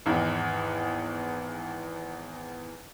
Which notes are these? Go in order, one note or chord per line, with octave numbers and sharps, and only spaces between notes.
G#1 E2